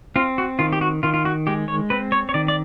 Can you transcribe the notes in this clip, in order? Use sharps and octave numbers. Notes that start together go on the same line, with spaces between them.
C4 F4
F#4
D#3 F4
G4
F#4
D#3 F4
F4
F#4
G#3 G4
C#5
C4 B4
C#5
C#5
D#3 D5
D5